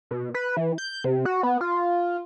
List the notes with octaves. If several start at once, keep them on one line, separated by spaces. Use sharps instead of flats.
B2
B4
E3
G6
C3
F#4
B3
F4